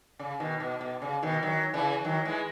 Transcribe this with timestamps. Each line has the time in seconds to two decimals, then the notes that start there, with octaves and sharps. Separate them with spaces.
0.19 C#3
0.40 B2 D#3
0.60 B2
0.81 B2
1.02 C#3
1.22 B2 D#3
1.43 D#3 F#3
1.74 C#3 E3
2.05 D#3 F#3
2.25 E3 G#3